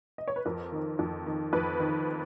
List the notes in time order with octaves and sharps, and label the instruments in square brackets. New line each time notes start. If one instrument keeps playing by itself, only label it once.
[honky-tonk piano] D#5
C#5
B4
F2 A#4
D#3
F2
D#3
F2 B4
D#3